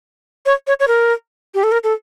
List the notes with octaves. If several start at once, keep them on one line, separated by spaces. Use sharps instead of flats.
C#5
C#5
C#5
A#4
G4
A4
A#4
A4